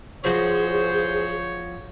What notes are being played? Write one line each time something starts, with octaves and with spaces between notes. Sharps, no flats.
E2 C#3 F3 F#4 G#4 C5 C#5